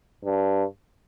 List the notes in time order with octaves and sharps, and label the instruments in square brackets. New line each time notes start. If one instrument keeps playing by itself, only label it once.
[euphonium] G2